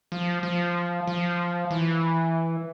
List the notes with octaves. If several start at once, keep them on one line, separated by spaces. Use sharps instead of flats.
F3
F3
F3
E3